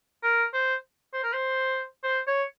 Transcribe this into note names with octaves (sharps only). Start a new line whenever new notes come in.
A#4
C5
C5
A#4
C5
C5
C#5